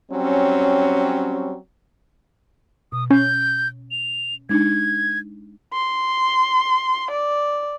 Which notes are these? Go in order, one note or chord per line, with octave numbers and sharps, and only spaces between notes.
F#3 G3 C4 C#4
B2 D#6
C#4 G6
F7
G#3 D4 D#4 G#6
C6
D5